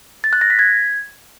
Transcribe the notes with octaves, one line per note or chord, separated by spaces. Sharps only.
A6
F#6
A#6
B6
G#6